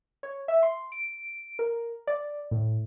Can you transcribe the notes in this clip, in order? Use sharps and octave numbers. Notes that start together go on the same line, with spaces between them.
C#5
E5
C6
D7
A#4
D5
A2